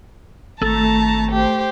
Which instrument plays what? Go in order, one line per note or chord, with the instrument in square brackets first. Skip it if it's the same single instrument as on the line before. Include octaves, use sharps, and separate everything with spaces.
[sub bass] G#1 [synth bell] A3 [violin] A5 A#5
[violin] G4 C5